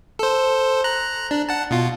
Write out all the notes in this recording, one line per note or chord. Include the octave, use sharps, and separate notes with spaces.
A4 C5
A#5 F#6
D4
F#5 A5
B2 F4